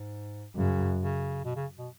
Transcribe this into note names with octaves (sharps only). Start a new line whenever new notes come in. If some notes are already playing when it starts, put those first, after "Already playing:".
Already playing: G#2
F#2 C#3
C#3
B2
C#3
B2